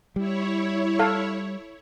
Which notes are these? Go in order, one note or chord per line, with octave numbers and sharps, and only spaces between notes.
G3 E4 C#5
A4 F5